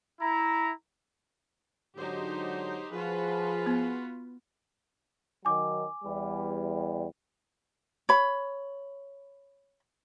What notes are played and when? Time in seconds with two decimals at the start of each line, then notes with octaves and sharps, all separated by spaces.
0.20 E4 A#5
1.97 G#2 D3 F#3 D#4 G4 C5
2.92 F3 F4 F#4 G#4 B4
3.66 B3
5.45 D#3 F#3 G#5 D6
6.04 E2 G3
8.09 C#5 B5